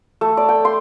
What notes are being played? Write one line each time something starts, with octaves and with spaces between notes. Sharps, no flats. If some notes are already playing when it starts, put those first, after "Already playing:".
A3
D5
G5
C6